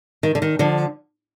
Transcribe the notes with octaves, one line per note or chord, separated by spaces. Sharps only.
D#3
D3
D#3
D3 F3